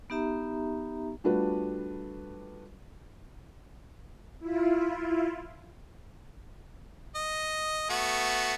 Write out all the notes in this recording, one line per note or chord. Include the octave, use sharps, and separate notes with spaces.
B3 D#4 G4 E5 A#5
G3 A3 D4 F4 F#4 B4
E4 F4
D#5
A3 B3 F#4